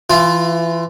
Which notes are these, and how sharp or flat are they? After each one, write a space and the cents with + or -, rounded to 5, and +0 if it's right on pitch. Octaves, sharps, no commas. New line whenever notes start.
E3 +25 F4 +0